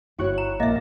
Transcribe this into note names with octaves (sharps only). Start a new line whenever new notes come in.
G1 E4 F#4 C#5 C#6 F#6
A#5
A#1 A#3 D#5 E5